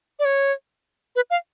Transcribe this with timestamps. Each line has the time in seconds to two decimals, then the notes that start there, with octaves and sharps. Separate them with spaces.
0.19 D5
0.25 C#5
1.16 B4
1.30 F5